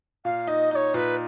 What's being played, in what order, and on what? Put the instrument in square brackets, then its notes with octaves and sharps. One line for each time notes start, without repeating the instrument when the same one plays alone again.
[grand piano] A#2 [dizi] F5
[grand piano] D#4 [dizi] D#5
[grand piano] D#4 [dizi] C#5 D#5
[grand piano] A#2 [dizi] B4